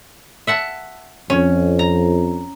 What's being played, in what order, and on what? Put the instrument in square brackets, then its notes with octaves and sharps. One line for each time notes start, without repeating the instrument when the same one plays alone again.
[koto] E5 F#5 A5
[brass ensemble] F2 [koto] C#4
[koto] A#5